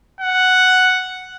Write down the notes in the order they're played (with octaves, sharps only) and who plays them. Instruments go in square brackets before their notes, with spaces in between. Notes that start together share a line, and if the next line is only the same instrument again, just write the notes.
[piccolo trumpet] F#5